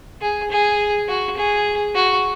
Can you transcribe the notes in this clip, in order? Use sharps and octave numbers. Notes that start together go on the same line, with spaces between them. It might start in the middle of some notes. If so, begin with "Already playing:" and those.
G#4
G#4
F#4
G#4
F#4